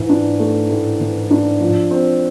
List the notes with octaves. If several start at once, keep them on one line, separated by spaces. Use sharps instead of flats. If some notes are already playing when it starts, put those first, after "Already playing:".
Already playing: G#2 E3
D4
A3
A2
E3
D4
F3
C4